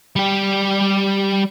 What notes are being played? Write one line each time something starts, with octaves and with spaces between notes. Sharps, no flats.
G3 G4